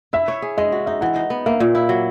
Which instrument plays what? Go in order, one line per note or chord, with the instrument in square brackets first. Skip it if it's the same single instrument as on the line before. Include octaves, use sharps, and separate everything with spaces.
[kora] E4 [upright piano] E5
[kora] C#5
G#4
[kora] G#3 [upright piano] D#5
[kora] F#4
[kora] D#4 [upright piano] E5
[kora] E3 [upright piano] F#5
[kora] D#4
B3
[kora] A#3 [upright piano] E5
[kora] A#2
E4
F#3